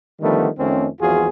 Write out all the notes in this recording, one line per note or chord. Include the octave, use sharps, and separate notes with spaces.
D3 D#3 F3 G3 A3 B3
F2 D#3 A3 C4 C#4
G#1 E2 F3 F4 F#4 G#4